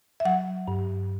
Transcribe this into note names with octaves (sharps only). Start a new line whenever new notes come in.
E5
F#3 F#5
G2